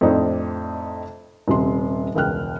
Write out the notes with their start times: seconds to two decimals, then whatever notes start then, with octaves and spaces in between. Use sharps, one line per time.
0.01 F2 A2 C4 D4 D#4
1.48 D#1 C3 C6
2.15 E1 C#2 G5 F6 F#6